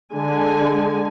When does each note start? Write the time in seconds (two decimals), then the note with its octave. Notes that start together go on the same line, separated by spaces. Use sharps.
0.15 D3 G#3 G#5